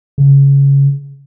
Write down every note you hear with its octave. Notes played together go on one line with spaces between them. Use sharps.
C#3